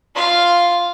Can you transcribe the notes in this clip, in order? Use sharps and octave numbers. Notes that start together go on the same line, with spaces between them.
F4 F5